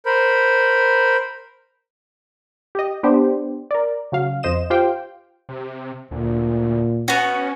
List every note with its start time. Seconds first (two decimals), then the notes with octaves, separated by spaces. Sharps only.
0.06 A#4 C5 B5
2.75 G4 D#5
3.03 B3 D4 G4 C5
3.71 A#4 D5
4.12 C#3 F#3 F5
4.43 F2 C5 D#5 E7
4.70 F4 G4 C5 F5 G5
5.49 C3
6.11 D2 A#2
7.08 B3 C#4 F#4